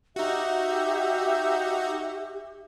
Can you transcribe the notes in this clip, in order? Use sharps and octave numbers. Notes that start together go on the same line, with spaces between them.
D#4 F#4 G4 E5